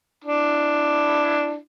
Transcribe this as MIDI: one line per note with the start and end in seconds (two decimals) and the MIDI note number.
0.24 1.56 62
0.24 1.56 64